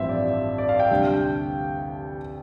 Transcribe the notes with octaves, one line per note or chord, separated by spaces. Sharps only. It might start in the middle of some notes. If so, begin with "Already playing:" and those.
Already playing: A1 G2 F3 C4 E4 E5
D5
D5
F5
G5
D2 C3 G3 D4